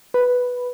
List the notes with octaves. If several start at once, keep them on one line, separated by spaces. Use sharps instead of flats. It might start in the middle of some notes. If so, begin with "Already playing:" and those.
B4